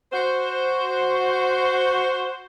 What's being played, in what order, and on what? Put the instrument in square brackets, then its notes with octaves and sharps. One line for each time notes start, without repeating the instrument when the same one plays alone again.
[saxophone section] F#4 C5